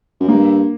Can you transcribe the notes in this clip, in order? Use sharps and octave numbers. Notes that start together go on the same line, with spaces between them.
F#2
G2 A#3